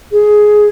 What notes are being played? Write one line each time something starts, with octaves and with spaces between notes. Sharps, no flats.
G#4